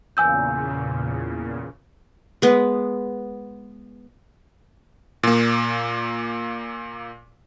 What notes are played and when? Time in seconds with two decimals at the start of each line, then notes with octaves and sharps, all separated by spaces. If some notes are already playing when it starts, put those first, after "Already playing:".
0.17 E2 A#2 C#3 G#5 E6 G6
2.42 G#3 B3
5.23 A#2 A#3